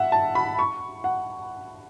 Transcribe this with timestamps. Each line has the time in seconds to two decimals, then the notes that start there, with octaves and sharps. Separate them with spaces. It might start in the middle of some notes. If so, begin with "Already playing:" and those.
Already playing: E5 F#5
0.12 A5
0.35 B5
0.59 C#6
1.04 F#5